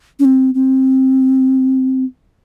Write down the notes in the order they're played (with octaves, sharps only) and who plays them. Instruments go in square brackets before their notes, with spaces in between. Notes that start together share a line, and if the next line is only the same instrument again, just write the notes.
[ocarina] C#4
C4
C4